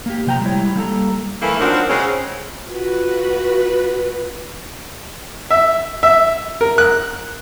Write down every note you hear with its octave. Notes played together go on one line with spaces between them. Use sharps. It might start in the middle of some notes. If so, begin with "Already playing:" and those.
A#3 G4
C3 F3 G5 A5 A#5
G3 G#3 E4 C#5
G3 A#3 A4 A#5
E3 A3 A#3
D#3 F3 F#3 C4 D4 F#4
C#3 G#3 C4 C#4
F4 F#4 B4
E5
E5
A#4
F#6